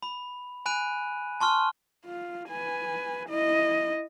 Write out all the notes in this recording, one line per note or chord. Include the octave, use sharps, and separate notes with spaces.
B5
G#5 B5 F#6 D#7
A5 C6 C#6 F6
F4
B4 G#5
E4 D#5